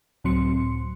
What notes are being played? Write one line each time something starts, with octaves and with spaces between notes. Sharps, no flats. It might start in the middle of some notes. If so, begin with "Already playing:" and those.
C#2 A2 F#3 C4 C6 C#7